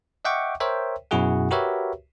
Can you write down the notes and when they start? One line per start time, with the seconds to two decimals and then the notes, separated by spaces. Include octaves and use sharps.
0.25 D#5 E5 F#5 G5 C#6 D6
0.60 A#4 C5 C#5 E5 G5
1.11 F#2 B2 E4 F#4 G#4 F#5
1.51 F#4 G4 A#4 B4 C#5 E5